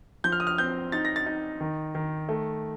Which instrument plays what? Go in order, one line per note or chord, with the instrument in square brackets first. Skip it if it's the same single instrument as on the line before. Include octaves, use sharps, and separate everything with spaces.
[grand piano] F3 G6
F6
D#6
F6
C4 G6
D#4 A6
A#6
A6
D#4
D#3
D#3
A3